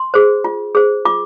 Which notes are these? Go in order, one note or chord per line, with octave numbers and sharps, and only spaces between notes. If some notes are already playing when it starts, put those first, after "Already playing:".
Already playing: C6
G#4 C5
F4
G#4 C5
F4 D6